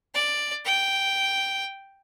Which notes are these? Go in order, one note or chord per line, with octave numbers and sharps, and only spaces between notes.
D5
G5